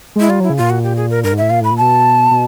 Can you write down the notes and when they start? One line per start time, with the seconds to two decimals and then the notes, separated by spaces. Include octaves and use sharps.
0.16 G#3 E4
0.29 G3 F4
0.40 F#3 E4
0.50 C#3
0.57 A#2 F4
0.70 F#4
0.83 G4
0.97 G#4
1.10 A#4
1.24 G2 A#4
1.33 G#2
1.38 A2 E5
1.50 A#2 F5
1.61 A2 B5
1.71 A#2
1.77 B2 A5
2.31 B2